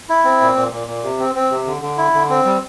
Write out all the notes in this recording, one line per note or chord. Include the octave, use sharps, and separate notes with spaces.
E4
C4
A#2
A#2
A#2
A#2
C3
C4
C4
C3
D3
D3
E4
D3
C4
G3